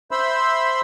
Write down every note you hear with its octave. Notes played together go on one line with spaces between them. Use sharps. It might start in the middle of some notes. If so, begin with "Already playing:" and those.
C5 E5 B5 C6 E6